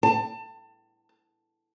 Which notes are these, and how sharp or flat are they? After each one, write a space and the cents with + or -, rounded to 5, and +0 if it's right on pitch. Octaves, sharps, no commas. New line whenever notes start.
A5 +25